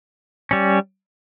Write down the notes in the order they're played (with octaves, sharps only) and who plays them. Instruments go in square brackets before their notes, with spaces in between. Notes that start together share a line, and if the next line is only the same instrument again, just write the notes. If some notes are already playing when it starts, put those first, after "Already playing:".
[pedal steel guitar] G3 C#4